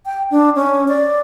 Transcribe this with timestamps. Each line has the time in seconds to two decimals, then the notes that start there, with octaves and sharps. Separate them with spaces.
0.06 G5
0.31 D4
0.56 C#4
0.88 D5